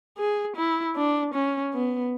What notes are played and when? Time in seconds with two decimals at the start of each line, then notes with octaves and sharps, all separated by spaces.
0.18 G#4
0.56 E4
0.96 D4
1.34 C#4
1.74 B3